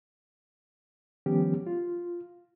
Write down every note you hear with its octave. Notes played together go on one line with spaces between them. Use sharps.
D#3 F3 G3 B3 C#4 G4
F4